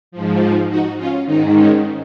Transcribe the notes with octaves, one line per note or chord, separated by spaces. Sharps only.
G#2 F3
D#4 F#4
C#4 F4
G#2 D#3 D#4
C#4